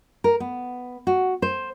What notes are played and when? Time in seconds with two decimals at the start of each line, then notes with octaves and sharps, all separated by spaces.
0.24 A#4
0.40 B3
1.07 F#4
1.42 C5